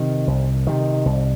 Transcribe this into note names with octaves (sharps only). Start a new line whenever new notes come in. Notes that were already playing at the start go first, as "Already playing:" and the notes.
Already playing: C3 D#3
C2
C3 D#3
C2